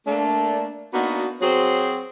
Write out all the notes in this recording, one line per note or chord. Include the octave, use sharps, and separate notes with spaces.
A3 A#3 D4
A#3 B3 D4 D#4 F#4
F#3 C4 F#4 G#4 C5 C#5